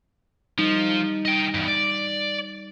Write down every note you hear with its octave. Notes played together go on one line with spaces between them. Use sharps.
F3 G3 D#4
D#5 G5
E2 G2
D5